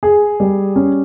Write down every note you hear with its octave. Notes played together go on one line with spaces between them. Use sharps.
G#4
G3
C#4